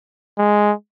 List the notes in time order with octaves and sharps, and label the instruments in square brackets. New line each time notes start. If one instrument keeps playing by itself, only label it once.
[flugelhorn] G#3